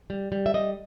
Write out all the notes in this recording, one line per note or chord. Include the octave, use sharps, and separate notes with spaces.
G3
G3
E5
G3 D#5